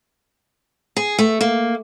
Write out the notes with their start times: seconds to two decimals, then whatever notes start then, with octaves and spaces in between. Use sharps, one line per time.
0.97 G#4
1.19 A3
1.41 A#3